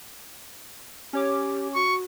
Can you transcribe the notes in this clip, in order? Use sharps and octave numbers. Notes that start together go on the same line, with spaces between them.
C#4 G4 C#5 D6
F#4 C#6